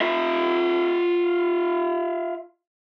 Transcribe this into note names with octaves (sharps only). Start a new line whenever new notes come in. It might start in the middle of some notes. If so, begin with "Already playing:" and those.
F4 E5